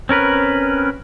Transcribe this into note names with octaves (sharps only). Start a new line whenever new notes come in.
C4 C#4 A#4 B4